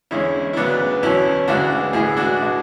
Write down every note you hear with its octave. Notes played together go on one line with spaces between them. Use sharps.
E2 D3 G#3 C#4 E4
E4
D2 C#3 F#3 B3 D4
E2 B2 F#3 C#4 E4
D2 C#3 E3 G#3 D4 F#4
A2 E3 G#3 E4 G#4
D4 F#4
B2 G#3